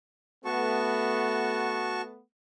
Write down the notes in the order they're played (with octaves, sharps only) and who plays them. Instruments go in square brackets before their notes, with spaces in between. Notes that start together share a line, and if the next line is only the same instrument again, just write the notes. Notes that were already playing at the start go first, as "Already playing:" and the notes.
[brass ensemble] A3 B3 [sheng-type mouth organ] F#4 A5 C#6